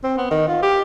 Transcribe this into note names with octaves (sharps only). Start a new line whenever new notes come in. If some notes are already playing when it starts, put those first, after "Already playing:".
C4
B3
D#3
F4
G4